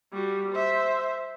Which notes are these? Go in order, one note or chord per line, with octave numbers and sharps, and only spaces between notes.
G3 F#4
C5 E5